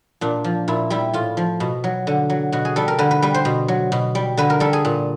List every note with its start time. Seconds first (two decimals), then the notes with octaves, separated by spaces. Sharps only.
0.21 A#2 D4
0.44 F3
0.68 A#2 E4
0.90 G3 E4
1.13 A2 F4
1.37 F3
1.60 B2
1.84 F#3
2.07 D3
2.30 F#3
2.52 B2 F#4
2.65 G#4
2.76 G3 A4
2.88 A#4
2.99 D3 B4
3.11 B4
3.22 G3 B4
3.34 C5
3.45 B2
3.68 F#3
3.92 B2
4.15 G3
4.37 D3 B4
4.50 A#4
4.60 G3 A4
4.73 G#4
4.85 A#2